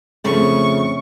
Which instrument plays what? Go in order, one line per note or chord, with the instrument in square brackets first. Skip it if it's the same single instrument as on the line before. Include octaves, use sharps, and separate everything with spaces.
[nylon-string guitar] F2 C#3 A3 [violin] C#6